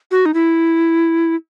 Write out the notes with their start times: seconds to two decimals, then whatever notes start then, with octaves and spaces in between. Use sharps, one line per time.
0.11 F#4
0.26 D#4
0.34 E4